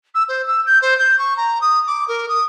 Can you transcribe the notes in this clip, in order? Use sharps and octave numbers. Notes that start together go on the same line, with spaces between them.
E6
C5
E6
G6
C5
G6
C#6
A#5
D#6
D6
A#4
D#6